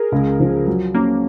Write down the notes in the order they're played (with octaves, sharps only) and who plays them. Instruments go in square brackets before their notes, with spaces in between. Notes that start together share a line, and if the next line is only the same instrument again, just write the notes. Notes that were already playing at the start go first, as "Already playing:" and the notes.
Already playing: [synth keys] G#4 A#4
[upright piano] C#2
F3
F#3
[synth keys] A#3 [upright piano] C#4